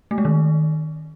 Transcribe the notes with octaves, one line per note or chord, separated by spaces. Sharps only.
A3
G#3
D#3